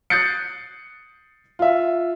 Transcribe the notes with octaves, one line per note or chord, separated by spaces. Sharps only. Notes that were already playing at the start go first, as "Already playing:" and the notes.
D#6 F#6 G6 A6 C7 C#7
F4 E5